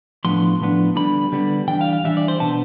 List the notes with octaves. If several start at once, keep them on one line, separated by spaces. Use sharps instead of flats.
A2 F3 B3 D4 C6
A2 F3 B3 D4
D3 G3 B3 D4 B5
D3 G3 B3 D4
E3 G3 D4 G5
F5
F5
E3 G3 D4 E5
D5
C5
B2 B3 D4 A5